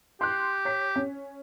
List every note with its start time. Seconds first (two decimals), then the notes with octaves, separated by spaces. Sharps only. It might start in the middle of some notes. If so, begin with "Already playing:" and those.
0.21 G4 C6 F#6
0.65 C#5 B6
0.96 C#4